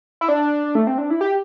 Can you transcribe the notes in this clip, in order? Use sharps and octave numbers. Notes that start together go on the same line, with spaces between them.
E4
D4
A3
C4
D4
E4
G4